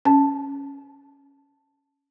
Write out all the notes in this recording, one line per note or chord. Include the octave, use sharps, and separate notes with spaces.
C#4 A5